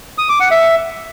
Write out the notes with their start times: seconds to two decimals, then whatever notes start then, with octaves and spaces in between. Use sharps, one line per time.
0.18 D#6
0.29 D6
0.40 F#5
0.51 E5